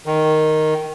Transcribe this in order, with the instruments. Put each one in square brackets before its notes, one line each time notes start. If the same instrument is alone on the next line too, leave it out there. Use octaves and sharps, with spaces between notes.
[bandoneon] D#3